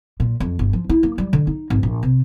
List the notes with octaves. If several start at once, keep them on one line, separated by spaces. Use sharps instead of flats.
A#2
F2
G1
F3
E4
A#3
G3
D3
D#4
G#1
A#1
C3